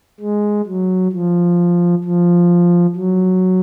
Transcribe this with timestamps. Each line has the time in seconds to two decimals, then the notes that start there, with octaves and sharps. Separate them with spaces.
0.21 G#3
0.67 F#3
1.13 F3
2.04 F3
2.96 F#3